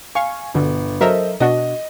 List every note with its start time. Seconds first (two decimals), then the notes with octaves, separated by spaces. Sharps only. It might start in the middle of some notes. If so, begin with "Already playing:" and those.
0.15 F5 G#5 C#6
0.54 G1 B2 D3
1.01 F#3 A4 A#4 C5 D#5 E5
1.40 B2 D4 F#4 D#5